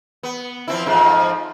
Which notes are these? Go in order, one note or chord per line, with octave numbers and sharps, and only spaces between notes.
B3
F3 C4 E4
F2 G#2 F3